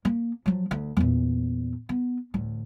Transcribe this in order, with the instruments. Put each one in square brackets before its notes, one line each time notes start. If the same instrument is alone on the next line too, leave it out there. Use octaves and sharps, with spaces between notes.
[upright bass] A#3
F3 F#3
D2
E2 A#2
B3
A1 D2